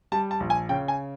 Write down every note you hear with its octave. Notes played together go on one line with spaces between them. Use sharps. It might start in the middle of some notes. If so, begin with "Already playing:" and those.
G3 A5
A5
A#1
G#5
C#3 G5
G#5